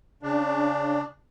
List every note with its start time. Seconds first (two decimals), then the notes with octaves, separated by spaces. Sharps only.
0.23 C#3 D4